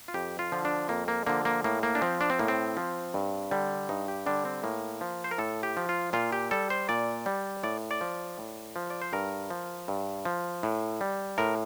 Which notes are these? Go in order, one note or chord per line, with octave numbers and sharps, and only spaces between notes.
F4
F2 G4
F4
D3 F3
D4
F2 A#3
A#3
D3 F3 A#3
A#3
A2 A#3
A#3
D4
F3 C4
D4
C4
A2 A#3
C4
F3
G2
D3 G3
G2 D#4
G4
D3 G3 D4
C4
A2 A#3
F3
C5
A#4
A2 A4
G4
F3
F4
A#2 F4
G4
G3 A4
C5
A#2 D5
G3
A2 D5
D5
F3
A2
F3
D5
C5
G2 A#4
F3
G2
F3
A2
G3
A2 A#4